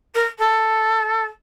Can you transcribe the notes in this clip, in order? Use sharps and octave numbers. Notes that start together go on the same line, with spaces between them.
A#4
A4